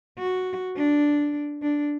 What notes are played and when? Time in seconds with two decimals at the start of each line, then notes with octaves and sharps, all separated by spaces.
0.18 F#4
0.76 D4
1.62 D4